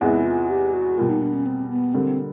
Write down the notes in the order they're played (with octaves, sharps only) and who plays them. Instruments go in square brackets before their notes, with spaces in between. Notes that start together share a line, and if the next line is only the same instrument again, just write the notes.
[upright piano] E2 C3 E3 G#3 B3 [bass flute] E4
[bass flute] F4
G4
F#4
[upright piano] B2 G3 A#3 [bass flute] F4
[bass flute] D#4
D4
C#4
C4
B3
[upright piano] D3 G3 A#3 [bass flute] C4